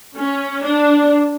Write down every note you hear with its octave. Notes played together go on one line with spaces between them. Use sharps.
C#4
D4